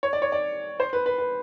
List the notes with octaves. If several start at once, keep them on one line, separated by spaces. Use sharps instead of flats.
C#5
D5
C#5
D5
C5
B4
B4
B4